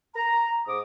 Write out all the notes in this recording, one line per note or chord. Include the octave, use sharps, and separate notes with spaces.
A#5
G#2 D6 D#6